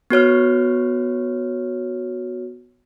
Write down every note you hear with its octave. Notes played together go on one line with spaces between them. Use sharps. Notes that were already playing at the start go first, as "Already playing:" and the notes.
B3 F#4 C#5 F6